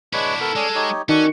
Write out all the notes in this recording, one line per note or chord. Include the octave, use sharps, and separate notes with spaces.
G#3 D4 E4 F#4 B4 C#5
B3 A4 A#4
G#3 C#4 G#4 D5
D#4 G4 C#5
D#3 C#4 F#4 A4 D5